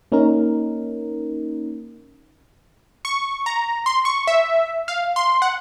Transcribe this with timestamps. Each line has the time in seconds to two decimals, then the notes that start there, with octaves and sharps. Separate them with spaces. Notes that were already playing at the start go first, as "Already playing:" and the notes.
0.12 A#3 C#4 D#4 A#4
3.05 C#6
3.46 A#5
3.86 C6
4.05 C#6
4.27 E5
4.88 F5
5.16 C6
5.42 F#5